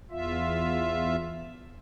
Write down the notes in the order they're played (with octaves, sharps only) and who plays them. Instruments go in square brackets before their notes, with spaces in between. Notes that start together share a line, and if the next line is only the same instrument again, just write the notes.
[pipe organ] E2 F4 E5